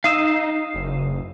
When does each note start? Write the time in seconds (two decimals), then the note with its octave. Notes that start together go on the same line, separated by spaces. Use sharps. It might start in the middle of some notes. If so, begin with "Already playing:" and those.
0.04 D#4 F5 D#6 E6
0.74 F#1